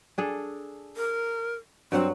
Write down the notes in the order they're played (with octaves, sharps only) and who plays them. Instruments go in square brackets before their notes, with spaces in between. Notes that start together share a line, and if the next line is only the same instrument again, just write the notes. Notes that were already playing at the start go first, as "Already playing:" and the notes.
[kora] D4 G#4 A4
[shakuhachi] A#4
[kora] G2 F#3 F#5 [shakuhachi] C4